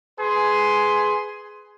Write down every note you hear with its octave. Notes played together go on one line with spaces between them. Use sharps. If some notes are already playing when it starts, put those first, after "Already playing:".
G#4 B4 C6